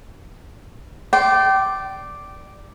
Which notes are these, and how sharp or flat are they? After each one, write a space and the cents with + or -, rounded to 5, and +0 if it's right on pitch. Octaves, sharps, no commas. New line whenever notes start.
D5 +0 G5 -30 C6 +0